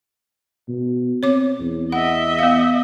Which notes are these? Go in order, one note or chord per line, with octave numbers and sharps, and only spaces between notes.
B2
C4 C#5 D6
E2
D#5 E5 F#5
B3 F5